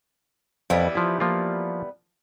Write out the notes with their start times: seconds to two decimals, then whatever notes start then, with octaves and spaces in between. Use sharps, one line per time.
0.70 F2 E3 G3 B3
0.95 F3 E4
1.20 F3 A#3 F4